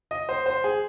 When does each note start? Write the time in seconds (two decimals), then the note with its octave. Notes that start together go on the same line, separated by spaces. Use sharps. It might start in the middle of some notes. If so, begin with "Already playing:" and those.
0.11 D#5
0.29 C5
0.46 C5
0.64 G#4